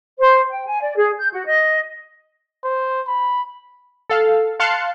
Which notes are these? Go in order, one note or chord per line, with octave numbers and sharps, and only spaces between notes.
C5
G5
G#5
D5
G#4
G6
F#4
D#5
C5
B5
A4 F5
F5 A5 C6 F#6 C#7